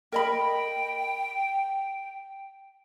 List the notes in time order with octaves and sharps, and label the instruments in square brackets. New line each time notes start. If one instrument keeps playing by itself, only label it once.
[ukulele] A#4 D#5 B5 [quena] G5